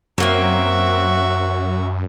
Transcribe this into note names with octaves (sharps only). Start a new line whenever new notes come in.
F#2 F#3 A#3 C4 F#4 E5